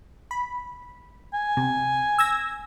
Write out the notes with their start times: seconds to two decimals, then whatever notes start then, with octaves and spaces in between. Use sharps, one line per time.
0.31 B5
1.34 G#5
1.57 C3
2.19 E6 G#6 A#6